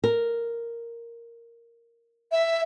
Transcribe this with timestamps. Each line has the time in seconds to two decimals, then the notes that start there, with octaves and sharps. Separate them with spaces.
0.04 A#4
2.31 E5